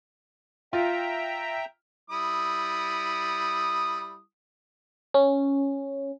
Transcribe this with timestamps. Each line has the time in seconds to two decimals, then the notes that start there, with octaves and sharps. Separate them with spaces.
0.73 F4 E5 G5 A#5
2.10 G3 E4 D#6
5.14 C#4